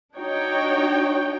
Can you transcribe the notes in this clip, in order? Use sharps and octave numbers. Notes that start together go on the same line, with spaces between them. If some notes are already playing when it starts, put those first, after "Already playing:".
D4 D#4 F#4 C#5 G5